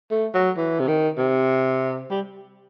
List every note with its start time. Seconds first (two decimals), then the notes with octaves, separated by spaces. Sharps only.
0.11 A3
0.34 F#3
0.58 E3
0.80 C3
0.88 D#3
1.18 C3
2.10 G3